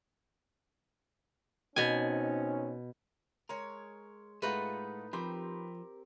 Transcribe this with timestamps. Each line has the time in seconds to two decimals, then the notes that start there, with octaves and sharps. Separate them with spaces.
1.76 B2 C4 C#4 D#4 G#5
3.49 G#3 A#4 C#5
4.42 A2 G#3 A3 D#4 F4 B4 F#5
5.13 F3 C4 G4 A#4 B5